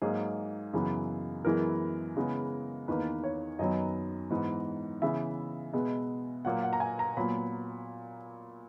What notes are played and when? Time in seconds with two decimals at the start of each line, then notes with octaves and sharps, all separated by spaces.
0.02 G#2 F#3 A#3 G#4
0.73 F#2 C#3 E3 B3
1.44 F#2 E3 G#3 B3 A#4
2.16 C#3 E3 G#3 B3
2.88 E2 D#3 A#3 B4
3.24 C#5
3.59 F#2 D#3 F#3 B3 D#5
4.30 G#2 E3 B3
5.02 C#3 E3 B3 E5
5.73 B2 G#3 B3
6.45 A#2 F#3 A#3 F#5
6.63 F#5
6.73 A#5
6.80 G#5
6.99 A#5
7.17 A#2 F#3 B3 B5